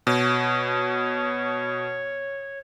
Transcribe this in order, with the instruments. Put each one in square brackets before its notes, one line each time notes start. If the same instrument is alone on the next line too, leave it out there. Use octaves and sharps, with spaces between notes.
[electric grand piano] B2 [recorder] C#5